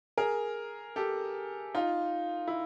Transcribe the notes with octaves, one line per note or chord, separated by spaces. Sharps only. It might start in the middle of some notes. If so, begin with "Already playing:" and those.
G#4 A#4
G4 A4
D#4 F4
E4